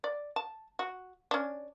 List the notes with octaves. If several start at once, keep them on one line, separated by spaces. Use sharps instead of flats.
D5
A5
F#4
C#4 D4